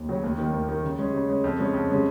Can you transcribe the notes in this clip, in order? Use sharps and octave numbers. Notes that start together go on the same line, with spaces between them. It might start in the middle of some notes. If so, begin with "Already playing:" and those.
Already playing: D#2
C#3 F#3 C#4
D#2
D#3 A#3
D#2
D#3 A#3
C#3
G#3 C#4
C#3
G#3 C#4
F2
C#3 G#3 C#4
F2
C#3 G#3 C#4